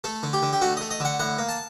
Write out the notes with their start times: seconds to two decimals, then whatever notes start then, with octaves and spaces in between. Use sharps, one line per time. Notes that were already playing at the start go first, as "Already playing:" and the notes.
0.04 A3 A4
0.23 D3
0.33 G4
0.42 D3
0.53 G4
0.61 A3 F#4
0.77 A3 D#5
0.91 D#5
1.00 D3 F#5
1.20 A2 F#5
1.38 A#3
1.49 A5